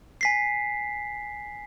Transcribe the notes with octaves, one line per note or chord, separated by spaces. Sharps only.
G#5 B6 C7